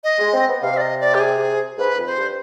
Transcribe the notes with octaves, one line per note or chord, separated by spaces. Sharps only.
D#5
G#3
C4
B3
C3 F5
D5
D#5
D5
G4
G#4
G#2 B4
F2
C5
G2